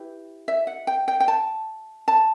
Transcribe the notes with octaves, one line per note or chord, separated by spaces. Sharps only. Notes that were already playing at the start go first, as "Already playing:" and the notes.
Already playing: E4 G4 B4
E5
F#5
G5
G5
G5
A5
A5